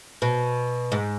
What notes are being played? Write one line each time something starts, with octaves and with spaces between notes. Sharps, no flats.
B2
G#2